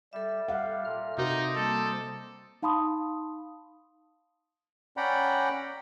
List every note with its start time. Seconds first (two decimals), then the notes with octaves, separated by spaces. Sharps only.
0.13 G3 A4 E5
0.48 G3 F5 F#5
0.85 A#2 F6
1.18 C3 D#4 F#4 A#4 C5 D5 D#5
1.56 G3 A#3 A4
2.62 D#4 F5 A5 B5 C6 D#6
4.97 C#4 D5 F#5 G5 A#5 B5